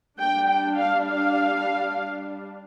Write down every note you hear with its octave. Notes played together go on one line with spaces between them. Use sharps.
G3 D4 G5
G5
F5
F5